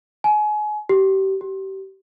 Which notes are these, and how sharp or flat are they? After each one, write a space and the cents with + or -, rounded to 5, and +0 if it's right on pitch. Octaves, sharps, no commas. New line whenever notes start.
G#5 +30
G4 -30
G4 -30